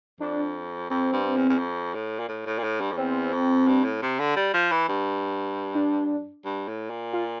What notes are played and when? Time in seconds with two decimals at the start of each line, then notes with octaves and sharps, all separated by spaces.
0.20 F2 D4
0.90 F2 C4
1.13 G2
1.36 E2
1.49 E2
1.59 F2
1.94 A2
2.19 A#2
2.28 A2
2.46 A2
2.58 A#2
2.63 A2
2.81 G2
2.92 F2
2.97 E2 C4
3.33 F2
3.68 G2
3.84 A2
4.02 C3
4.19 D3
4.36 G3
4.54 F3
4.71 E3
4.89 G2
5.75 D4
6.45 G2
6.68 A2
6.90 A#2
7.13 F4